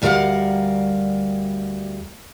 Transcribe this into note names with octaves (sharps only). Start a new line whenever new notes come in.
D2 G3 A#4 B4 F5 F#5